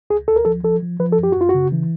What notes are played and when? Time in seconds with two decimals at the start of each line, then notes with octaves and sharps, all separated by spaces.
0.10 C#2 G#4
0.28 D2 A4
0.36 A#4
0.45 F3 A4
0.63 F3 A4
0.82 F3
1.00 F3 B4
1.12 A4
1.18 F#2
1.23 G4
1.32 F#4
1.36 F#2 F4
1.49 F#4
1.55 C#3
1.72 E3